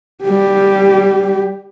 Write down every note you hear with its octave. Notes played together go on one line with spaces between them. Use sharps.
G3 G4